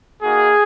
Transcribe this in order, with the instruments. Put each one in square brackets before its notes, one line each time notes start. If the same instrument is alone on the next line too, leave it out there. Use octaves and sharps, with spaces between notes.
[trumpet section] A#3 D#4 F#4 G#4